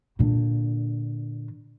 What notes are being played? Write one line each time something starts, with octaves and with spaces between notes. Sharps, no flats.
A#2 D3